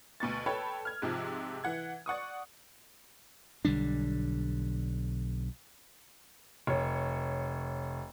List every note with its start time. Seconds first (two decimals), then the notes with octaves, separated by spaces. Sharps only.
0.20 D2 B2 C#6 A6
0.46 A4 B4 C#5 G5 A5 B5
0.85 F6 G#6
1.02 G#2 C3 F3
1.64 E3 F#5 G#6
2.06 D5 F#5 C#6 D#6
3.65 B1 D3 G3 D4
6.67 F1 C#5